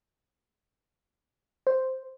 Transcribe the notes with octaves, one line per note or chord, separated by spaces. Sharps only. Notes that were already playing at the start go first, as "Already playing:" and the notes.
C5